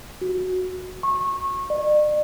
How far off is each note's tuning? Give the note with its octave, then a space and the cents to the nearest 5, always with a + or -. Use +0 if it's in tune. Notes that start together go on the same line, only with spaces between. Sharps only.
F#4 -5
C#6 -25
D5 +40